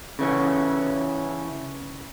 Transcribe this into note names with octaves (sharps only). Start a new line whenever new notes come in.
C#3 E3 C#4